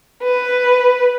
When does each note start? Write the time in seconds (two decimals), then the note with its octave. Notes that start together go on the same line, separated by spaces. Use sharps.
0.23 B4